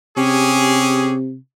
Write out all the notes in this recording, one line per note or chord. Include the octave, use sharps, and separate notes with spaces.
C3 C#4 G4 G#4